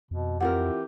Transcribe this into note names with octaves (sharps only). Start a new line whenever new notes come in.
F2 B2
E3 C4 E4 F4 G4 A#4 F#5